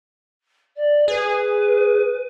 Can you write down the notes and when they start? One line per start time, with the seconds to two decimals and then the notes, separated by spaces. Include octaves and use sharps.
0.76 D5
1.08 G#4 B4